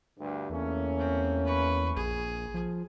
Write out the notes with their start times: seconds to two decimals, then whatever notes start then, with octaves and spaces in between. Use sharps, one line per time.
0.19 D2 G2
0.50 E2 A3 A#3 C#4
0.99 C4
1.46 B4 C#6
1.96 A#1 G#4
2.54 F3